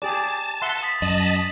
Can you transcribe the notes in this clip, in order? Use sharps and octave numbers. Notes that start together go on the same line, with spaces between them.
G4 G#4 D5 A5
E5 F#5 C6
D#6 A6 B6
F#2 D#5 A5 F#7